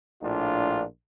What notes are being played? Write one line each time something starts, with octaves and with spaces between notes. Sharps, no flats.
A#1 A2 D4 F4